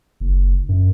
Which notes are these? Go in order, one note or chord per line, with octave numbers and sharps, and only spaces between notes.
F#1
F#2